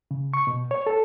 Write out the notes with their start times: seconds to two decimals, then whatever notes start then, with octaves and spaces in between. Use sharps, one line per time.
0.11 C#3
0.34 C#6
0.47 B2
0.71 C#5
0.87 A4